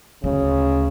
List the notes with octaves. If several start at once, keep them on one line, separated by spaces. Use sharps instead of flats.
D2 C#3